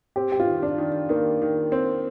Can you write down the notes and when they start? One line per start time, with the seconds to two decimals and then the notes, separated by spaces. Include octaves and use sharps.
0.16 C4 G4
0.32 G4
0.40 F4
0.47 D#3
0.63 D4
0.78 D#3
1.09 D#3 A#3
1.42 D#3
1.72 C4